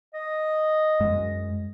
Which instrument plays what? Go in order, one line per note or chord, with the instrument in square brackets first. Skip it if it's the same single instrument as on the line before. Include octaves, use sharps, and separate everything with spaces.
[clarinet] D#5
[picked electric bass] F#2 G#3